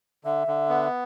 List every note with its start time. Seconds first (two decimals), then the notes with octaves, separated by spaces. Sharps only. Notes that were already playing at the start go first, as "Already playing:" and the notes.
0.24 D3 E5
0.47 D3
0.69 B3